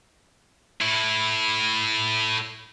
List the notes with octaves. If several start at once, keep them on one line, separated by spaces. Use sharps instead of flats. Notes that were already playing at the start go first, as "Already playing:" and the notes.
A2 E4